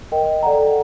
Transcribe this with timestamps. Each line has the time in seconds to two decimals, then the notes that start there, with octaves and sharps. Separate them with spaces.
0.12 A#4 D#5 G5
0.43 A4 D5 F#5 A#5